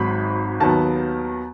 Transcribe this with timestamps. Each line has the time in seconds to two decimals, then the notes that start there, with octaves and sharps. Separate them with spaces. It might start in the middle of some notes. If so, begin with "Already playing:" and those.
Already playing: G#1 G#2 F#3 B5
0.60 D#2 D#3 F#3 B3 A5